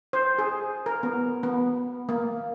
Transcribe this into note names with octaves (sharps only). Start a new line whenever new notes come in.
C5
G#4
A#4
B3
B3
A#3